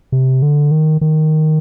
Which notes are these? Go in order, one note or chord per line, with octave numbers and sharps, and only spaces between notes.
C3
D3
D#3
D#3